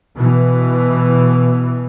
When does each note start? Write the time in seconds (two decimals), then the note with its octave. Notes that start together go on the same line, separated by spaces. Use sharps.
0.18 B2 E3